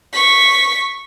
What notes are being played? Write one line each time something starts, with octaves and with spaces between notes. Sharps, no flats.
C#6 B6